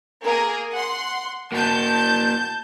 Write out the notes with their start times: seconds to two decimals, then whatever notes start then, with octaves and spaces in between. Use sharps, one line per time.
0.23 A#3 G#4 A#4
0.73 F#5 C6
1.52 A#3 F#4 A5 G6